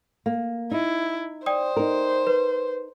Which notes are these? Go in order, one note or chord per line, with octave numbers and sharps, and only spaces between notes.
A#3
D#4 E4
C5 D5 G5 D#6
D#4 A#4
B4